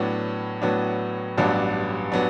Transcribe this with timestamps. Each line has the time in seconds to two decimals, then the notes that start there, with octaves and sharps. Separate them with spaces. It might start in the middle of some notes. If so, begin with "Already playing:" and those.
Already playing: A2 F#3 B3 D4
0.62 A2 F#3 B3 D4
1.38 A1 G2 F#3 B3 D4
2.12 F#3 B3 D4